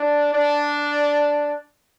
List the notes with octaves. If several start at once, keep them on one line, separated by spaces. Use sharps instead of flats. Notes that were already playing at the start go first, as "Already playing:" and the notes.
Already playing: D4
D4